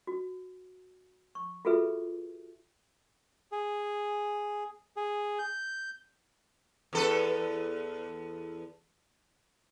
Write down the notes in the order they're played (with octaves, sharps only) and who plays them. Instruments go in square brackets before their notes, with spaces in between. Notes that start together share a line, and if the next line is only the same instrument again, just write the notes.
[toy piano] F#4
C#6
F4 F#4 G#4 A4 B4 E5
[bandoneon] G#4
G#4
G6
[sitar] E2 A4 B4